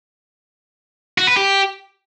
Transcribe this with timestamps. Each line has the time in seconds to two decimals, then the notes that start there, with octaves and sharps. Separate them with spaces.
1.18 F#4
1.27 B4
1.37 G4